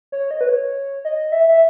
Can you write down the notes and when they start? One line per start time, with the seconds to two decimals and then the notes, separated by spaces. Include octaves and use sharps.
0.12 C#5
0.31 D#5
0.41 B4
0.49 C#5
1.05 D#5
1.32 E5
1.48 E5